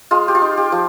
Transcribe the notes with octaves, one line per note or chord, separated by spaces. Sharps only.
G#3 F4
G4
F4
D#4
G4
F3